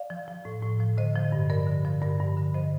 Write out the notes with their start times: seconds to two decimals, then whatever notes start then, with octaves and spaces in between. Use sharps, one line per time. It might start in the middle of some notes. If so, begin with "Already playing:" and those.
Already playing: D5 F5
0.10 F3
0.28 F3
0.45 A2
0.62 A2
0.80 F3
0.97 D3 C5 D#5
1.15 F3
1.32 G2
1.50 G2 A#4 D5
1.67 D3
1.85 F3
2.02 G2 A#4 D5
2.20 G2
2.37 D3
2.54 F3 C5 D#5